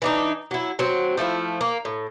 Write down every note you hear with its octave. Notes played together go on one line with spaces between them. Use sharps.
E3 D4 D#4
F#3 E4
F#3 C4
F3 A3 D4 E4
A#3
A2